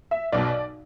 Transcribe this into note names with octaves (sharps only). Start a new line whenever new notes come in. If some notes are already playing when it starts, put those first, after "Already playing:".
E5
B1 B2 F#3 D5